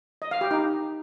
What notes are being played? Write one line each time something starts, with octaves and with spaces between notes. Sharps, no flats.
D#5
F5
G4
D#4